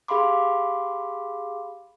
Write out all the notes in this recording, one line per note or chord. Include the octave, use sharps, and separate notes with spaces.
G4 G#4 F5 B5 C6 D6